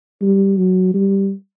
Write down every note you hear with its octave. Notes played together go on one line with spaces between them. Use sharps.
G3
F#3
G3